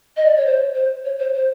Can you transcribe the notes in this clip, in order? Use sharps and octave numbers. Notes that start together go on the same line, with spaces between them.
D#5
D5
C#5
C5
C5
C#5
C5
C5